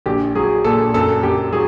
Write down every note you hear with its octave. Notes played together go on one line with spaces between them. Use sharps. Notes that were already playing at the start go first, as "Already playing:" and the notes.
A#1 G4
F#3 G#4
A#2 A4
F#2 A4
F#2 G4
F#3 G#4